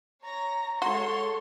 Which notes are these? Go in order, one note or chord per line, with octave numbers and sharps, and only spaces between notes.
C#5 A#5 A#6
G#3 F#4 A4 C#5 C6